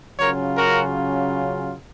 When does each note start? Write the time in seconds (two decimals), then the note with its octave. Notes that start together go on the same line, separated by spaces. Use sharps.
0.19 C#3 F#3 C#4 F4 A#4 C#5
0.57 F#4 A#4